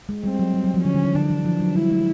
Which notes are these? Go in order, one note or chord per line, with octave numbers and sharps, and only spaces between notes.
G#3
G3 C4
F#3
G3
F#3
F3
D3 C#4
D3
E3
D3 D4
E3
F3
F#3
G3 E4
G#3